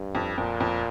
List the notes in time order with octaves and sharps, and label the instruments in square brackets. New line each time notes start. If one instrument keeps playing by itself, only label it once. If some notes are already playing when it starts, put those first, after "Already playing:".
Already playing: [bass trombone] G2
[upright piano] F2
[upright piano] F2 [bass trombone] A#2
[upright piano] F2